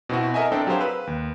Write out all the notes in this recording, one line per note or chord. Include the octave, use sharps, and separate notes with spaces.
B2 C4 E4 F#4
A4 A#4 D#5 E5 G#5
C4 D4 A4 A#4 G5
F#3 G4 G#4 A#4 C5 F5
B4 E6
D#2